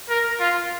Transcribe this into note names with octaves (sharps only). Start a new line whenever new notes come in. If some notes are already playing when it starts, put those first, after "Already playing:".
A#4
F4